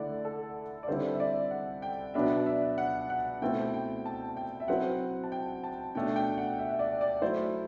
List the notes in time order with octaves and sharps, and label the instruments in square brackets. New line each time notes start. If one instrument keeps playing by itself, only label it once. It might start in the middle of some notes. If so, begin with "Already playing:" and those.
Already playing: [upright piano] D3 A3 E4 [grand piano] D5 F#5
[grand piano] A4
D5
[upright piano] D3 G3 C4 E4 [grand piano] C5
[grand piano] E5
D5
F#5
G5
[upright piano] B2 F#3 B3 D4 [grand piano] E5
[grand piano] D5
E5
F#5
F#5
[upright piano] B2 A3 C4 E4 [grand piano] G5
[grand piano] G5
A5
G5
E5
[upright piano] F#3 C4 E4 [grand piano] F#5
[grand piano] A5
G5
A5
[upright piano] B2 A3 D4 [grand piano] G5
[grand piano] G5
F#5
E5
E5
D5
D5
[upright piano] F#3 A3 E4 [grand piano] C5